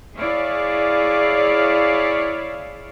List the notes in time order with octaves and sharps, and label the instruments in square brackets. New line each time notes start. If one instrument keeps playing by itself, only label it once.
[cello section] E4 G#4 C#5 D5 F5